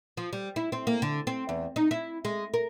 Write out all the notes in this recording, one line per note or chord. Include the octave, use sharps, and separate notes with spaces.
F3
G3
E4
C4
A#3
D3
C4
E2
D#4
E4
G#3
A#4